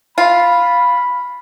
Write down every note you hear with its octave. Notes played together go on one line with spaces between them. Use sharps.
F4 B5